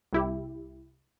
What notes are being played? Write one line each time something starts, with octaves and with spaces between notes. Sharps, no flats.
C2 E4 G4